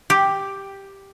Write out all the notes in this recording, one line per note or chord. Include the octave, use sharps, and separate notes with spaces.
G4